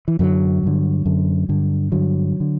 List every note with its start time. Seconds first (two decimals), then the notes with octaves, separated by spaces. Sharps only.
0.08 E3
0.19 F#2 D3 F#3
0.63 G2 D3
1.06 F#2 D3
1.49 G2 D3
1.92 G2 D3 F#3
2.40 D3